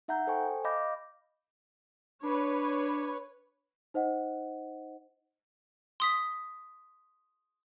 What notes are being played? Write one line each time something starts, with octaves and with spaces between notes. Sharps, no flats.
D#4 E5 F#5 A#5 G6
A4 C5 G5 G#5 C#6
D#5 F5 B5 D6 G6 A#6
D4 B4 C#5
D#4 C5 D#5 F#5
C6 D#6 B6